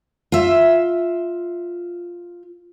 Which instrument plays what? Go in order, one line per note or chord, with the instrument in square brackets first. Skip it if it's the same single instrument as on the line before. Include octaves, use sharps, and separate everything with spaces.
[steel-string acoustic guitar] F4 E5